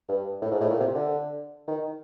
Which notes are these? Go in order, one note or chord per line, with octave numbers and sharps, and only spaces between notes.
G2
A2
G#2
A2
A#2
C3
D3
D#3